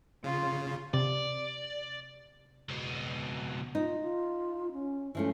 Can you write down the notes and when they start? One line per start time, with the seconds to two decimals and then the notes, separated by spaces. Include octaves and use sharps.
0.24 C#3 F4
0.94 C3 D5
2.69 C#2 B2
3.75 D#4 F4
4.00 F4
4.72 C#4
5.15 E3 F3 A3 C#4